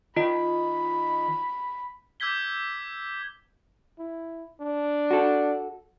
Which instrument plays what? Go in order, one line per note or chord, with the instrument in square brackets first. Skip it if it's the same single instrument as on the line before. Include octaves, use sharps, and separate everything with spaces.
[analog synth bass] D#3 [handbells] F4 D#5 [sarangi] B5
[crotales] D6 E6 G6 G#6 B6 G7
[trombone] E4
D4
[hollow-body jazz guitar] F#4 A4